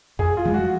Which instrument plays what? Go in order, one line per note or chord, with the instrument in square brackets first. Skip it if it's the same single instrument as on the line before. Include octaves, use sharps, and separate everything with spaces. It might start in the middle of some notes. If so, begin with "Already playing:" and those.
[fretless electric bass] F2 [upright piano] G#4
[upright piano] F4
[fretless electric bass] F3 G#3
[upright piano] F#4